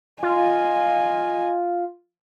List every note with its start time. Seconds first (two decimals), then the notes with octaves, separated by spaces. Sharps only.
0.23 F4 D#5 G#5